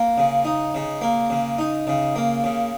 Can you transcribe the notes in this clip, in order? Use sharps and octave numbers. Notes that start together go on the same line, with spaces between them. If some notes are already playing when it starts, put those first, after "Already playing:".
Already playing: A#3
C#3
D#4
C#3
A#3
C#3
D#4
C#3
A#3
C#3